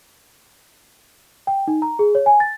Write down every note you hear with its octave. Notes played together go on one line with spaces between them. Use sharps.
G5
D#4
A#5
G#4
C#5
G#5
A6